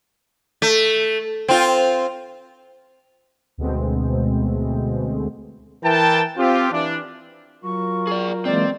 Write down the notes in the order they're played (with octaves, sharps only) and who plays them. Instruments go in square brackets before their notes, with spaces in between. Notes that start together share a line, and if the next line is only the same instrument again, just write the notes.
[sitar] A3
C4 F4
[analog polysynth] D2 B2 G#3 A3 C4
[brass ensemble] E3 A#4 G5 A5
C4 F4 G4
E3 D4
[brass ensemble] F#3 F4 A#4 [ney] C#6
[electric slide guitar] G#4 D5
[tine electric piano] E3 G#3 A#3 [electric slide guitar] C4 [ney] D5